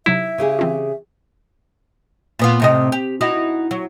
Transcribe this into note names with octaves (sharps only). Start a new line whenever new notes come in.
C3 F#3 D#4 E4 E5
C#3 G4 G#4
E3 C4 F4
A#2 B3 F4
A2 C3 D#5
G4
D#4 E4 F#4
F#3